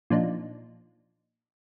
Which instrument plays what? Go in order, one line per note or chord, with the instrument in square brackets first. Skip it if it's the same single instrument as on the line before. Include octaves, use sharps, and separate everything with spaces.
[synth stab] A#2 F3 D4 D#4